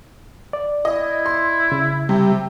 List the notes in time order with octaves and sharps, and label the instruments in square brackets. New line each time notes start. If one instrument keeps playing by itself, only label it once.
[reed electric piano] D5
[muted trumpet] E4 [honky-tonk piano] D#5
[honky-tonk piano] C6
[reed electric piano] C#3
[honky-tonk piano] C3 [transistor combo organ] G3